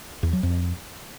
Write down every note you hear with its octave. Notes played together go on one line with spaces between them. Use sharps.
E2
F#3
F2